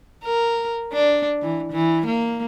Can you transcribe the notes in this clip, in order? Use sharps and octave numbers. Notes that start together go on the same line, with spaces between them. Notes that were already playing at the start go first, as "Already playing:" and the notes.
A#4
D4
E3
E3
A#3